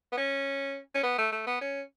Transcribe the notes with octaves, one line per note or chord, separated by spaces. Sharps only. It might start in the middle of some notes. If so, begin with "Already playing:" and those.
B3
C#4
C#4
B3
A3
A3
B3
C#4